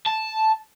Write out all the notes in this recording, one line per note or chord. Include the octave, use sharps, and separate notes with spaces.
A5